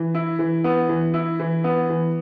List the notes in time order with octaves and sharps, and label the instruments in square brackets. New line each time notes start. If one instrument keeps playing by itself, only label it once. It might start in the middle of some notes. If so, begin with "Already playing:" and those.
Already playing: [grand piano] E3
E4
E3
B3
E3
E4
E3
B3
E3